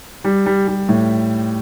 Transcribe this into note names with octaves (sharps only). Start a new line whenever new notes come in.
G3
G3
G3
A2